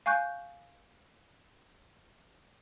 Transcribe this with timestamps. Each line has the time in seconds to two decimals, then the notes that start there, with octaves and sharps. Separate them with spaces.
0.06 F5 G#5 C#6 F#6 G6